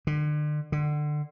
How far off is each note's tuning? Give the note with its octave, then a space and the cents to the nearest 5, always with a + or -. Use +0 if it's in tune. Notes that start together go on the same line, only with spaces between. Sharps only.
D3 +35
D3 +25